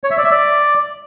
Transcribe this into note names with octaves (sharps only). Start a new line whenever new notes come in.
C#5
E5
D5
E5
D5